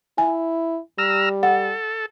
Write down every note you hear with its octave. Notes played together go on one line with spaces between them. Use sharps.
E4 G#5
G3 A#5 E6 F6
A4 F#5